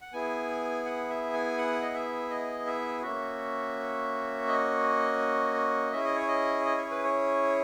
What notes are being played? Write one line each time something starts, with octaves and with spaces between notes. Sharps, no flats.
F#5
B3 E4 G#4 G#5
F#5
E5
G#5
F#5
D#5
E5
D#5
E5
A#3 C#4 F#4 E5
D#5
C#4 E4 G#4 E5
D#5
C#5
D#5
D#5
C#5
B4
C#5